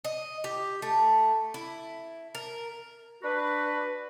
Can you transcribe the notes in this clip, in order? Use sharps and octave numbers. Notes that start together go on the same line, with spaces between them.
D#5
G4
A3
E4
A#4
D4 F#4 B4